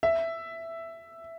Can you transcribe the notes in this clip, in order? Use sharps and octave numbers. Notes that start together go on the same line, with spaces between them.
E5